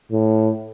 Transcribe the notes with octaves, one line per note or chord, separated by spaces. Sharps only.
A2